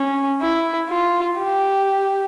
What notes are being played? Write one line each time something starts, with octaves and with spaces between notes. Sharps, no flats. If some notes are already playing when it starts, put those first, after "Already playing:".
Already playing: C#4
E4
F4
G4